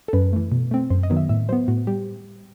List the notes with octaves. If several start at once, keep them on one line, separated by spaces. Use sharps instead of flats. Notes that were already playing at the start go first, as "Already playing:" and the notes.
A4
F#2 B4
E3 A3
B2
A3 C4
F#2 C5
D#5
D#3 F#3 B3
E5
A2 E5
F#3 B3 C5
A2 F#4
G3 G4